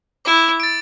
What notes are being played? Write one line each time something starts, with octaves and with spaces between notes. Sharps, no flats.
E4 D6
A6 D7